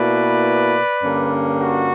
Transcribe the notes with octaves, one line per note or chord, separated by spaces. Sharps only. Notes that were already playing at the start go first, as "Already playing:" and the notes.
Already playing: B2 A#3 E4 B4 D5
G2 D3 A#3 C#4
F#4